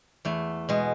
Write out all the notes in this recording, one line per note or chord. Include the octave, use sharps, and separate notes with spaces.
E2 A3
B2 G#3